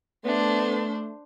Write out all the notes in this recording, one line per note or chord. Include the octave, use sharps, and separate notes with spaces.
A3 B3 D4 C5